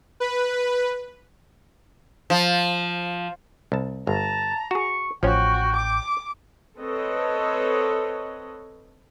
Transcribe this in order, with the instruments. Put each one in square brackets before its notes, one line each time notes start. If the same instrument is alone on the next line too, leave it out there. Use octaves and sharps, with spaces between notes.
[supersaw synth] B4
[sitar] F3
[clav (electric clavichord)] C2 A5
[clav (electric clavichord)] G1 [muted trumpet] A5 [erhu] A#5
[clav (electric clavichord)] F#4 G#4 [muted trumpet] C#6
[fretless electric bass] A1 [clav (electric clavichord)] F3 C#4 [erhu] F#4 [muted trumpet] G5
[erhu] D6
[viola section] C4 A4 B4 C#5 D#5